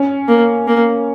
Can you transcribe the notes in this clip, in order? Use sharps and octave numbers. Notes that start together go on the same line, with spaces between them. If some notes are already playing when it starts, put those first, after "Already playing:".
Already playing: C#4
A#3
A#3